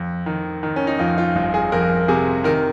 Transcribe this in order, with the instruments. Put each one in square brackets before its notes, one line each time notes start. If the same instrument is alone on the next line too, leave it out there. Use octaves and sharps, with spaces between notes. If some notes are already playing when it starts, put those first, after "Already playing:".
Already playing: [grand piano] F2
D#3
D#3
C#4
D#4
F2 F4
F4
G1 F4
G#4
F2 A#4
C3 G#4
D#3 A#4